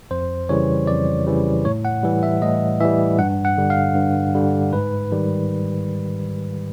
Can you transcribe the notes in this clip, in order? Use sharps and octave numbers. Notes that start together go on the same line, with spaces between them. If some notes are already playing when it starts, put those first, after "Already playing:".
F2 C5
C#3 E3 G3 C#5
F2 D5
C#3 E3 G3
A2 C#5
F#5
E3 G3
E5
A2 D#5
E3 G3 E5
G2 F#5
F#5
D3 G3
F5
G2
D3 G3
G#2 B4
D#3 G3